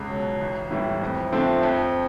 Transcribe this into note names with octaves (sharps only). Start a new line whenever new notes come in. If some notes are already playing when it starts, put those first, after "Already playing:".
Already playing: C#2
B2 F#3
A1
A2 E3 G3
F2
D3 F3 A3 C4
F2